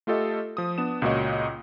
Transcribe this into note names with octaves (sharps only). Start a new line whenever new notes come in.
A3 F4 G4 A4 D#5 E5
F3 D#6
B3 D4 E7
C#2 A#2 F#4 C#5 D#5